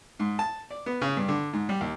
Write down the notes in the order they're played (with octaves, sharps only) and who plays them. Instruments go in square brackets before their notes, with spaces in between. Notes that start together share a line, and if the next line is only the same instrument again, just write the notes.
[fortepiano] G#2
A5
D5
B3
C#3
G2
D3
G#2
G3
D#2